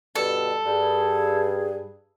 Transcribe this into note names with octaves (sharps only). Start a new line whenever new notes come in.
G2 B2 G3 A4
G2 G#4